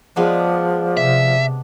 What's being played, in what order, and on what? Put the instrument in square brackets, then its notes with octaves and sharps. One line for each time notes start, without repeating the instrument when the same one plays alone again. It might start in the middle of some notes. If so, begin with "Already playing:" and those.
[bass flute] F3 [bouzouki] G#3 B3 D4
[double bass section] C3 [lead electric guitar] E5